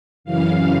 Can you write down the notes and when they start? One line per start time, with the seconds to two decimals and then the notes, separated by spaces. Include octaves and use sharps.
0.24 F#2 C#3 E3 F5